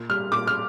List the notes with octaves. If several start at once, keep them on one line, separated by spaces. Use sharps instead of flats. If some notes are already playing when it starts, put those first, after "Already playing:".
Already playing: A#2
G3 F6
A#2 D6
F6